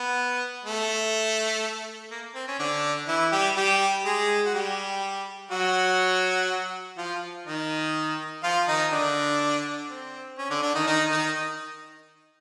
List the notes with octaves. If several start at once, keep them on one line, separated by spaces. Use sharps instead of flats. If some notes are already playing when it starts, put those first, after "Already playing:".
Already playing: B3
A3
A#3
C4
C#4
D3 D4
E3 E4
G3 G4
G3 G4
G#3 G#4
F#4
G3 G4
F#3 F#4
F3 F4
D#3 D#4
F3 F4
D#3 D#4
D3 D4
C4
C#4
D3 D4
D3 D4
D#3 D#4
D#3 D#4
D#3 D#4